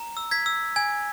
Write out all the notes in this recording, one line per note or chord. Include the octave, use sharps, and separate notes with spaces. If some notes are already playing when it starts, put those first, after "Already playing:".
Already playing: A#5
E6
G#6 B6
E6
G#5 G#6